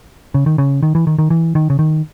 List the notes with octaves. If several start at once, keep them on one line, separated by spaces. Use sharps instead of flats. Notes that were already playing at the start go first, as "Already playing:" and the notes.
C#3
D#3
C#3
D#3
E3
D#3
D#3
E3
D#3
C#3
D#3